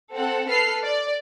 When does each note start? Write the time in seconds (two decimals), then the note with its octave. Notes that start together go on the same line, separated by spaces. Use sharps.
0.13 C4 A4 F#5
0.48 A4 B4 F6 C7
0.84 D5